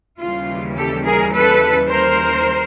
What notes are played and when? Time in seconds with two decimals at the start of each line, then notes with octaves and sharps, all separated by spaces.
0.19 D#2 C#3 E3 G3 F4
0.77 G4 A4
1.05 G#4 A#4
1.34 A4 B4
1.90 A#4 C5